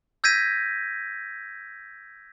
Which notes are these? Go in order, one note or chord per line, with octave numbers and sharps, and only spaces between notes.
E6 G6 G#6 A#6 B6 D#7